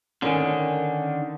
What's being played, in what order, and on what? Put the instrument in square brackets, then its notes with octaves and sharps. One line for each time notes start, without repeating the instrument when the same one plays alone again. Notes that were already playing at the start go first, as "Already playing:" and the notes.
[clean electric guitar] D3 D#3 [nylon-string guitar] C#4 A#4 G#5